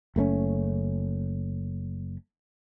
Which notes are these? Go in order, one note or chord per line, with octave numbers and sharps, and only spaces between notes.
F#1 A3 C4 C#4